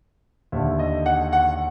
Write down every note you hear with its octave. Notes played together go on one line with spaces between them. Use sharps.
D#2 D3 E5
D#5
F#5
F#5